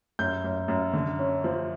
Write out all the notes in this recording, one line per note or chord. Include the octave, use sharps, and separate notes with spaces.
F#2 G6
F#2
F#2
D3
C#4
F3